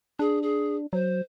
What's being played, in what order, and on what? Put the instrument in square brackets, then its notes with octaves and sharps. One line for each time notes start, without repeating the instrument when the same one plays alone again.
[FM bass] D4 [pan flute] G#4
[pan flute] G#4
[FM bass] F#3 [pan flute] C5